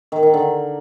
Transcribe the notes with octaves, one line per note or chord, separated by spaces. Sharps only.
D#3
D#3
D3